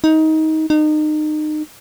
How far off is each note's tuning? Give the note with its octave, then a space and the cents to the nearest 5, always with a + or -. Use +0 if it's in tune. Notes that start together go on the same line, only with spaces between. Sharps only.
D#4 +20
D#4 -30